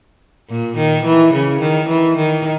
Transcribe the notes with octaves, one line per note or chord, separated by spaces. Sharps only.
A#2
D#3
E3
C#3
D#3
E3
D#3